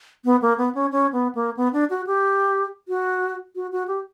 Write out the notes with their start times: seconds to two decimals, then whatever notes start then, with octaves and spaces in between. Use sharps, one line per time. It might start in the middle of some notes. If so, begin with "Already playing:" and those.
0.25 B3
0.42 A#3
0.58 B3
0.75 C#4
0.92 C#4
1.13 B3
1.35 A#3
1.57 B3
1.73 D4
1.90 F#4
2.07 G4
2.88 F#4
3.56 F#4
3.72 F#4
3.88 G4